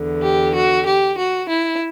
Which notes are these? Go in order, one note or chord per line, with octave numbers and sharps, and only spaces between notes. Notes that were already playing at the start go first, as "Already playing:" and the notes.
Already playing: E2 D3
G4
F#4
G4
F#4
E4